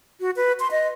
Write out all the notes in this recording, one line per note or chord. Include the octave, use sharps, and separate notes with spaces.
F#4
B4
C6
D#5